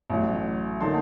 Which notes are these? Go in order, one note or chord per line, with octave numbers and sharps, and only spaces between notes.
A1 A2 F#3
D3 F#3 A#3 D#4 A5 C6